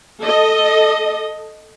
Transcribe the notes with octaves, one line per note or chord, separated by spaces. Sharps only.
A4 D#5